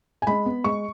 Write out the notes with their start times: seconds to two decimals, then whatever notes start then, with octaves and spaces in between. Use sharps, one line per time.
0.22 G#5
0.27 G#3 B5
0.46 B3
0.64 G#3 C#6